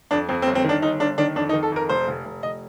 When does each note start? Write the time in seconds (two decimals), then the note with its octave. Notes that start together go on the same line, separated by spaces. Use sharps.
0.11 F2 D4
0.29 F2 C4
0.42 C4
0.47 G1
0.55 C4
0.64 D#3 D4
0.82 G1 D#4
1.00 G1 D4
1.18 D#3 D4
1.36 F2 D4
1.49 D#4
1.53 D#3
1.63 A4
1.72 F2 A#4
1.89 F1 C5
2.08 F1
2.25 F1
2.43 F1 D#5